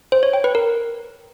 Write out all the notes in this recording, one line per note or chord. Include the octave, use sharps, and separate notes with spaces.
C5
C#5
G5
B4
A#4